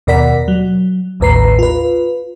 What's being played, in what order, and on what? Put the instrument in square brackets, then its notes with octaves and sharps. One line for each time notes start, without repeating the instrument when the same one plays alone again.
[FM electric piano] D#2 B2 A#4 D5 F#5 B6
F#3
A1 D#2 A2 B4 A#5 C7
F4 B4